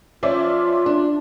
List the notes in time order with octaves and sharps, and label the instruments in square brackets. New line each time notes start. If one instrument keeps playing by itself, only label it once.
[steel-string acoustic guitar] F3 [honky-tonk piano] C#4 D5 E5 [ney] F4
[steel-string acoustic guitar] D4